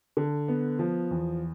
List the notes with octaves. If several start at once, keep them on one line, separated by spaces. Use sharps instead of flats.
D3
B3
F3
E2